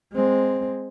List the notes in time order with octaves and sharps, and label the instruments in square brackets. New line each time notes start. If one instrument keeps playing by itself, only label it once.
[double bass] G#3 C4